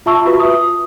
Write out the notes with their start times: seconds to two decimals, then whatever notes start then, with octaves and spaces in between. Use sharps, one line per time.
0.06 F4 E5 A5 C#6 E6
0.25 F4 F#4 B4 E5
0.40 D#6